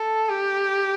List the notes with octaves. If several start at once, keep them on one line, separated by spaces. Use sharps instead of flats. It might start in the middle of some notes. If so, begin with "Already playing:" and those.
Already playing: A4
G4